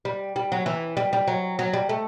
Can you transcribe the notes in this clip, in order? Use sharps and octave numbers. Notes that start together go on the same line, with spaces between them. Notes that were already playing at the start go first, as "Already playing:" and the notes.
G3
G3
F#3
E3
G3
G3
F#3
F#3
G3
A3